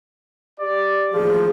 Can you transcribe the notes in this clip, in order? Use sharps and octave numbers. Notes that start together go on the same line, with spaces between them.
G4 D5
A1 D#2 F3 G#4